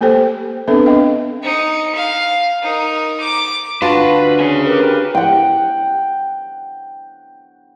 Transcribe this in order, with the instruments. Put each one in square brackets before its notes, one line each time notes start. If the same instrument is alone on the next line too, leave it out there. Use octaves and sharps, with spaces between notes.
[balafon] A3 A#3 G4 A4 C5 G5
B3 C4 D4 A4 B4 E5
D4 D#5 F5 G5
[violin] D#4 C#7
F5
D#4 A#4
D6
[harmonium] D2 [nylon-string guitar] D4 F#4 A5 [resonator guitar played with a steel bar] F4 [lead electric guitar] B4
[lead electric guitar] C#4 G#4
[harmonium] G4 A#4 B4
[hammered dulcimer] F#5 G5